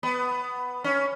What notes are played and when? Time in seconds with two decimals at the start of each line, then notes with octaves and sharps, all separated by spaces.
0.03 B3
0.84 C#4